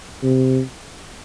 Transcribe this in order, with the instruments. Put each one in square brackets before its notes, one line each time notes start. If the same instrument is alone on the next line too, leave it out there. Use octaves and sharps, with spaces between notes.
[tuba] C3